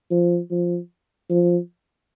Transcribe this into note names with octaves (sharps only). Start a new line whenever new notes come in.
F3
F3
F3